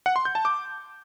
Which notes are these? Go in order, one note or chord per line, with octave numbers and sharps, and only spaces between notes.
F#5
C6
G6
A5
D6